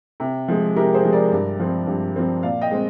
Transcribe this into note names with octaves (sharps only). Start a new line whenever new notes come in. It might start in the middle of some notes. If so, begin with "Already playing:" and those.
C3
F3 G#3
C3 G4 A#4
G#4 C5
F3 G#3
A#4 D5
G2
F3 C4
G2
F3 C4
A#2 D5 F5
D#5 G5
G#3 C4